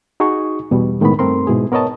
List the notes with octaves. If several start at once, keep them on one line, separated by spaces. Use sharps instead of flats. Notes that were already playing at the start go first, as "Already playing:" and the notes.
D#4 F#4 G#4 D#5 C#6
E2 B2 G3
A2 D#3 G#3 A3 B3 B5
G2 A3 C4 A#4 C6
G#2 B2 E4 G#4
B3 A#4 C#5 D#5 A5